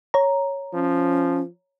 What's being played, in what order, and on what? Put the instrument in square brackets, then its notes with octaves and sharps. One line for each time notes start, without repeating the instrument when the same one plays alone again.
[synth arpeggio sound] C#5 A#5
[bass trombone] F3 [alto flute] C#4